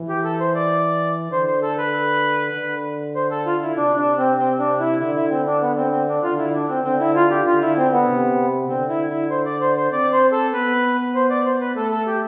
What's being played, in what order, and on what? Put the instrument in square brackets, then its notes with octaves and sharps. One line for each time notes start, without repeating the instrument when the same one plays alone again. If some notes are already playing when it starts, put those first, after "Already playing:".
Already playing: [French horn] E3
[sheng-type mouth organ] G4
A4
C5
D5
[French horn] D3 [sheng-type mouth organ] C5
[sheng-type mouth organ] C5
A4
B4
[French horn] D3
[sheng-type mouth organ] C5
A4
F4
E4
[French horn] C3 [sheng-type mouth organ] D4
[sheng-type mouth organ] D4
C4
C4
D4
E4
[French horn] D3 [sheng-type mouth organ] E4
[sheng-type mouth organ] E4
C4
D4
B3
C4
C4
D4
[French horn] D3 [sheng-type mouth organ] F4
[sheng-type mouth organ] E4
E4
D4
C4
[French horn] D3 [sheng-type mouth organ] C4
[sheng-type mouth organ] E4
F4
G4
[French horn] D3 [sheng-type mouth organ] F4
[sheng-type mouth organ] E4
C4
B3
[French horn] C3
[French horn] D3 [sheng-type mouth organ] C4
[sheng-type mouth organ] E4
E4
C5
D5
C5
C5
[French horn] C4 [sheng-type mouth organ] D5
[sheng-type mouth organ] C5
A4
[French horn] B3 [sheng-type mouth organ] B4
[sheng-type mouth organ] C5
D5
C5
B4
[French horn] A3 [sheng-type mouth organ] A4
[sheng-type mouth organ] A4
G4